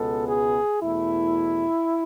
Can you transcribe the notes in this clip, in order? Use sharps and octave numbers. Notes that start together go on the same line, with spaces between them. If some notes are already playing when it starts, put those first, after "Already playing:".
Already playing: C#2 B2 G#3 B3 A4
G#4
E2 B2 A3 E4